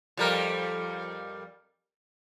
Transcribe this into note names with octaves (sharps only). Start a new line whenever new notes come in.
F2 G3 A#4